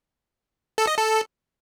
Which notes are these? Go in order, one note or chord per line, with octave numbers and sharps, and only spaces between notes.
A4
D#5
A4